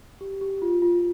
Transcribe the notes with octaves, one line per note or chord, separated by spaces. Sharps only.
G4
G4
F4
F4